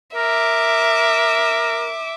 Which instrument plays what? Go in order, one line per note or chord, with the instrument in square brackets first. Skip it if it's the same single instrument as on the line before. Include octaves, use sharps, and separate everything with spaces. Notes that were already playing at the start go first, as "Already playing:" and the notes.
[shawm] A#4 [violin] E5 D6